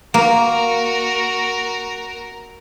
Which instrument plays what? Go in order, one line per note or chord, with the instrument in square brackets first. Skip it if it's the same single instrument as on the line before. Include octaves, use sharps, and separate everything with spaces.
[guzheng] A#3 [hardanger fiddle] F#4 A#4